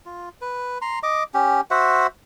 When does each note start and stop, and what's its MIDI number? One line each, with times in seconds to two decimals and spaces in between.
0.06 0.29 65
0.41 0.78 71
0.82 0.99 82
0.82 0.99 84
1.03 1.23 75
1.03 1.23 86
1.34 1.61 61
1.34 1.61 67
1.71 2.07 66
1.71 2.07 72
1.71 2.07 76
1.71 2.07 78